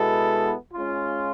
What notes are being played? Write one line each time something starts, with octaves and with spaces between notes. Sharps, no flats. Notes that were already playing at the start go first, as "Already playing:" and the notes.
Already playing: B2 G#3 B3 E4 A4
G#3 C#4 F4